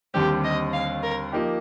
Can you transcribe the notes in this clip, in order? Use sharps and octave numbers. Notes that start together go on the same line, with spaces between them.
D#2 D3 G3 C4 G4
D#5
F5
A#4
F3 A#3 D#4 G4